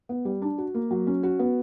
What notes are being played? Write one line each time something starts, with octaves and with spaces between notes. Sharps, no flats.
B3
G3
D4
F#4
A#3
F#3
C#4
F#4
B3